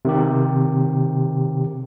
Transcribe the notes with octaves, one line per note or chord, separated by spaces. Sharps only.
C3 D#3 G4